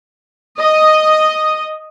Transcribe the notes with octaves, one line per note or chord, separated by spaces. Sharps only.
D#5